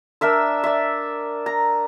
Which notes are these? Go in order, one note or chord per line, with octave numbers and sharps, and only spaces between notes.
D4 A#4 E5 E6
D5 E5
A#5